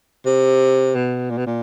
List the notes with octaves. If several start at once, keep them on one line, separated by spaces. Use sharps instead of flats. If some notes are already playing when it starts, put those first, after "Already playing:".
C3
B2
A#2
B2
A#2